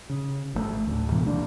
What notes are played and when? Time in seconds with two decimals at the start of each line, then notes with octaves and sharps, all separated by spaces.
0.10 C#3
0.54 G#1 C3 A3
0.87 D2 A2
1.12 G#2 B2 E3 G#3
1.27 D3 A#3 D4